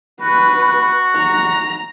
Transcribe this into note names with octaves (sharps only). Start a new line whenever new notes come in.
F#4 B4
A#5